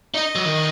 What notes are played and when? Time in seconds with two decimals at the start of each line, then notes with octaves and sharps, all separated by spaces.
0.14 D#4 D#5
0.35 F#3
0.45 D#3